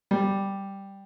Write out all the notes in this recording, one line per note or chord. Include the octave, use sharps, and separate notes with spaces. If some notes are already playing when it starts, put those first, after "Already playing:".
G3